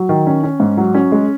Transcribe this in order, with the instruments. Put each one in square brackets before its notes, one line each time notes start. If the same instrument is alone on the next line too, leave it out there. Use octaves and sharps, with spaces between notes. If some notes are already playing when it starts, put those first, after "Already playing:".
Already playing: [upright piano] F#3
D#3
C#4
C#4
G#2
F#3
C#4
G#3